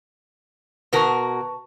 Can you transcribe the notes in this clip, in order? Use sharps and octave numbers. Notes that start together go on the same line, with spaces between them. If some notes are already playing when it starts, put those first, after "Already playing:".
B2 F#4 A#4 B4 A5 C#6